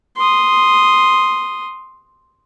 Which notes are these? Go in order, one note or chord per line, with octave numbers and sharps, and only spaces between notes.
C6 D#6